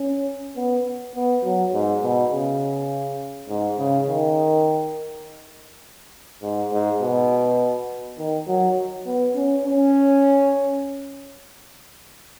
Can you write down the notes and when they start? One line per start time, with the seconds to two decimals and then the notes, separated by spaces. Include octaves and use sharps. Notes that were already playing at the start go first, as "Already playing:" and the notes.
Already playing: C#4
0.56 B3
1.15 B3
1.44 F#3
1.73 G#2
2.03 B2
2.32 C#3
3.49 G#2
3.79 C#3
4.07 D#3
6.42 G#2
6.72 G#2
7.02 B2
8.18 D#3
8.47 F#3
9.06 B3
9.35 C#4
9.65 C#4